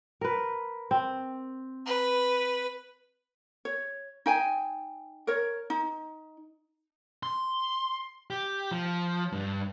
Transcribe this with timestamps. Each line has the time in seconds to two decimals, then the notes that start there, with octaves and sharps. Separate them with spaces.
0.21 A#4 B4
0.91 C4
1.86 B4
3.65 C#5
4.26 D#4 G5 G#5
5.27 A#4 C#5
5.70 D#4
7.23 C6
8.30 G4
8.71 F3
9.32 G2